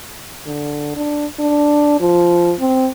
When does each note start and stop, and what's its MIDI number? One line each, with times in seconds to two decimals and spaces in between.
0.46 0.92 50
0.96 1.26 62
1.39 1.96 62
2.00 2.53 53
2.60 2.88 60